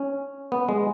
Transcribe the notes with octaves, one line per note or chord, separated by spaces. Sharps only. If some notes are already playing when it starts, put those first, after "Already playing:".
Already playing: C#4
B3
G#3